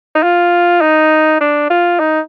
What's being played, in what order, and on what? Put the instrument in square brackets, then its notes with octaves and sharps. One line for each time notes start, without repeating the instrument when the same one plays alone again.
[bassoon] D#4
F4
D#4
D4
F4
D#4